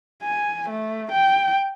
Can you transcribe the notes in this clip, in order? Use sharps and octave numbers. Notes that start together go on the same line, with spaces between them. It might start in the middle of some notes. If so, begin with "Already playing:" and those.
G#5
A3
G5